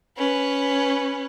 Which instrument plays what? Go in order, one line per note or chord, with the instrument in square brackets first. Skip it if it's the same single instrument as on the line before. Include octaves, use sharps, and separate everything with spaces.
[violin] C#4 B4